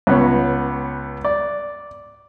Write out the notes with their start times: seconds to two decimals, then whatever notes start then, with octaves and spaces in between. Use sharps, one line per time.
0.07 C#2 B3 C#5
1.24 D5